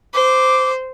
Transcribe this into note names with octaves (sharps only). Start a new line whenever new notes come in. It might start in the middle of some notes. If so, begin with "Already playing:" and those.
C5 D6